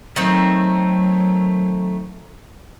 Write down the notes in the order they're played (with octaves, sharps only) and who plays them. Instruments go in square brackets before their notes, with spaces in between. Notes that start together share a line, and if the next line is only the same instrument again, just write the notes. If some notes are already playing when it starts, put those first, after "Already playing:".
[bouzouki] D#3 A3 C4 [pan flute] F#3